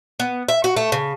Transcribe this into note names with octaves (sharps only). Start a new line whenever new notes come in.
B3
E5
F#4
A3
C#3